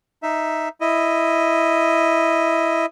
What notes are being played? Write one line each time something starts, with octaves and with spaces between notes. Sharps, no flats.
D#4 E5
E4 D#5